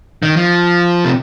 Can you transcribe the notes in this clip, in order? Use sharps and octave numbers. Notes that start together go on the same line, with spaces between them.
D#3
F3
C3